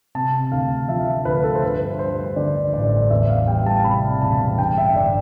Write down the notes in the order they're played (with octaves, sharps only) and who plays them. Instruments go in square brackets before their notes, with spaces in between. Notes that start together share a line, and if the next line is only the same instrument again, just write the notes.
[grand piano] C3 A5
D2 F5
F3 E5
E5
D2 B4
A4
C5
G2 B4
G3 C5
D3 D5
A1 D5
E2 E5
F5
G3 G5
A5
C3 B5
E1 A5
G2 G5
E5
G1 D5